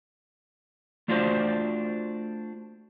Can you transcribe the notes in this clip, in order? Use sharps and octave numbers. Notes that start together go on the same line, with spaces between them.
A3 D4 F4 F#4 B4 C5